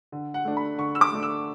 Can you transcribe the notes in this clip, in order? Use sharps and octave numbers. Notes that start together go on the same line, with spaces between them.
D3
F#5
A3 D4
B5
D3 C#6
E6
D6
A3 D4
E6